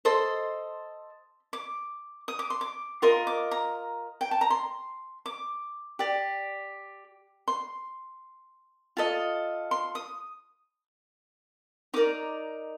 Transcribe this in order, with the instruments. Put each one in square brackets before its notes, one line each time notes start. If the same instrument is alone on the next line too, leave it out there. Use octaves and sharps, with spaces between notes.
[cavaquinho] A4 C5 D#5 C6
D6
D#6
D6
C6
D6
F4 A#4 D#5 C6
D6
A#5
G5
A5
A#5
C6
D6
G4 D5
C6
F4 A4 D#5
C6
D#6
D#4 A#4 D5 D6